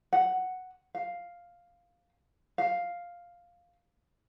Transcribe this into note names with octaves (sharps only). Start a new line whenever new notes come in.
F#5
F5
F5